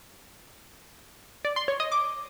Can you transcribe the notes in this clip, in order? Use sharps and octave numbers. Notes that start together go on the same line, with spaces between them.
D5
C6
C#5
D#5
D6